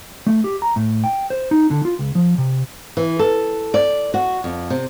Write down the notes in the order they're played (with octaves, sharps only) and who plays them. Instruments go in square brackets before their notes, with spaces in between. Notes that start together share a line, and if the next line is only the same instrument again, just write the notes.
[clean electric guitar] A3
G4
A#5
A2
G5
C5
D#4
D3
F4
C#2
F3
C3
[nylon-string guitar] E3
A4
D5
F#4
F2
C3